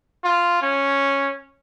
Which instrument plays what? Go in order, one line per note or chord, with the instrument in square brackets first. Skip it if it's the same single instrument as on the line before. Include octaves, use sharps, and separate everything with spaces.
[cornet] F4
C#4